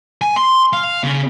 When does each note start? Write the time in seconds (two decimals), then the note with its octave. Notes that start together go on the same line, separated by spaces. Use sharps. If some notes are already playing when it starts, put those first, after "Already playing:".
0.21 G#5
0.36 C6
0.73 F5
1.03 C#3